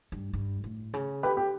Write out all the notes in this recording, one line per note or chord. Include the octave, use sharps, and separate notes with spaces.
G2
G2
A2
C#3
D3 G4 B4
G4